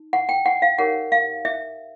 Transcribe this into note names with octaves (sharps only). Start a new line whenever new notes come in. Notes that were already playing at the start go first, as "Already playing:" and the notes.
Already playing: D#4
F#5
G5
F#5
F5
D#4 G4 A#4 C#5 F#5
F5
E5